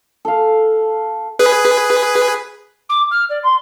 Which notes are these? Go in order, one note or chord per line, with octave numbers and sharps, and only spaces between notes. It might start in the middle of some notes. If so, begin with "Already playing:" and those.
A4 F5
G#4 B4
D6
F6
D5
C6